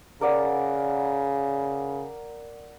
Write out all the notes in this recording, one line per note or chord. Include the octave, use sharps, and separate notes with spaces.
C#3 A#4 D5 F#5